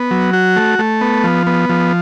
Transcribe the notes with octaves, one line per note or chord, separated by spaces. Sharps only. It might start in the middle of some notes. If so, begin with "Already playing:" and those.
Already playing: B3
F#3
F#4
A3
A3
B3
F3
B3
F3